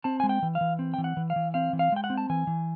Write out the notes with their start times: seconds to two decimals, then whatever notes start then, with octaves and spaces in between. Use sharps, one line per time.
0.04 C4 A5
0.20 G#3 G#5
0.29 G5
0.42 E3
0.55 F5
0.61 E3
0.79 C4
0.94 E3 G5
1.04 F#5
1.17 E3
1.30 F5
1.36 E3
1.54 C4 F5
1.73 E3
1.79 F5
1.92 G#3 G5
2.04 F#5
2.10 C4
2.17 A5
2.30 E3 G#5
2.47 E3